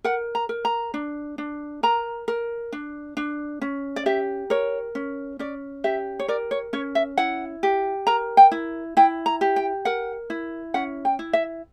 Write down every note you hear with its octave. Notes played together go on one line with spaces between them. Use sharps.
A#4 F#5
A#5
A#4
A#5
D4
D4
A#4 A#5
A#4
D4
D4
C#4
D5
G4 E5
A#4 C#5
C#4
C#4 D5
G4 E5
C#5
A#4 D5
C#5
C#4 C#5
E5
E4 F#5
G4
A#4 A#5
G5
E4
E4 G5
A#5
G4
G5
A#4 F#5
E4
C#4 F#5
G5
E4
E5